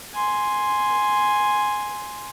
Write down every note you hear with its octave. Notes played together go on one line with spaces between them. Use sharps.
G#5 C6